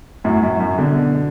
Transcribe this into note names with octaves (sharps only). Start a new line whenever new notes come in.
F#2 A2
F#2
F#2
B2 D3